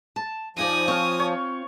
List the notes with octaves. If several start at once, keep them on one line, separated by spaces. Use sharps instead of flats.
A5
F2 F3 D#4 D5 G#5 D#6
C4 F4 C#5 F5
C#5